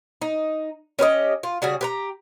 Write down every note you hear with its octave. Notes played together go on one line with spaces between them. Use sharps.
D#4
C#4 G4 B4 D#5
F4
C#3 G3 F#4 G#4
G4 B4 A#5